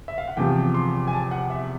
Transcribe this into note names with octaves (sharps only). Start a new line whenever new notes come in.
E5
F5
F#5
E2 C3 F3 G5
C6
G#5
A5
F#5
E5